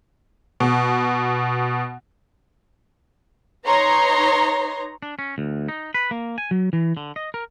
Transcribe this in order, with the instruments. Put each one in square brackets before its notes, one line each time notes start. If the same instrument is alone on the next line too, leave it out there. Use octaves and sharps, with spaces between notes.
[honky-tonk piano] B2
[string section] D#4 B4 C#5 A#5 C6
[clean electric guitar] D4
C#4
D2
D#4
B4
A#3
G#5
F#3
E3
D3
D#5
A#4